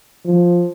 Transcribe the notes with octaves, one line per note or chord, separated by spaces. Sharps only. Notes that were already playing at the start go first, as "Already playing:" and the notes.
F3